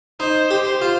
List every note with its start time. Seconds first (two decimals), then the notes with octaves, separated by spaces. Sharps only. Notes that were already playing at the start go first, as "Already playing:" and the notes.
0.20 D#4 C5
0.51 G4
0.65 C5
0.82 F4